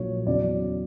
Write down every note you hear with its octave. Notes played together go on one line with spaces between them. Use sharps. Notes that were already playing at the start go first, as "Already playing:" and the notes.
Already playing: A#1 A#2 F#3 C#5
E2 C#3 F#3 D5